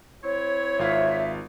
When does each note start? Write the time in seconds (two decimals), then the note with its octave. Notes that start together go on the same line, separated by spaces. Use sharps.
0.24 C4 E4 C#5
0.79 G#1 F4 E5 F5